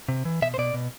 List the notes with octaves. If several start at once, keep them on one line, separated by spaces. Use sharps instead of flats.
C3
E3
B2 E5
C5
B2 D5
B2